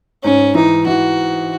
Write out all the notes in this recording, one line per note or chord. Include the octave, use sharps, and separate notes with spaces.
G#2 C#4
E3 D#4
E3 F#4